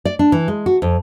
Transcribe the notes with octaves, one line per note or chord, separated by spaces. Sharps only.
D5
D4
E3
G#3
F#4
F2